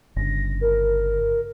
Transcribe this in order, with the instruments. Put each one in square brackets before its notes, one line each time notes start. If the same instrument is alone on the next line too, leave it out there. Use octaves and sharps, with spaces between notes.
[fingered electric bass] G1 C#3 [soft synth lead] A#6
[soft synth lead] A#4